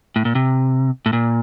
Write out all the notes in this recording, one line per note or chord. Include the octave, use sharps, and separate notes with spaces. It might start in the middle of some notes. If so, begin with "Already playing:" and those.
A2
A#2
C3
A2
A#2